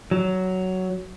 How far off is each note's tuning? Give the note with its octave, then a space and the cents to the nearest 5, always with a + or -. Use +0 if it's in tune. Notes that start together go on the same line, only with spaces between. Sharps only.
F#3 +10